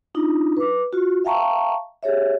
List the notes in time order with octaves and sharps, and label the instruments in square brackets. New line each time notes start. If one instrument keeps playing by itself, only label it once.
[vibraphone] D4 D#4 F4
B4 D6
F4 F#4
E5 F5 G5 A5 A#5 C#6
G4 G#4 C#5 E5